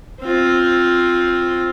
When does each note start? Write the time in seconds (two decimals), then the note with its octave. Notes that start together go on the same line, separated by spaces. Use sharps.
0.21 C4 F4